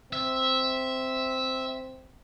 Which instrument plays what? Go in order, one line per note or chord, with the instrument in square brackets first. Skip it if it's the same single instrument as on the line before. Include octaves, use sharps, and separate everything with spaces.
[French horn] C4 [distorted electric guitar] E5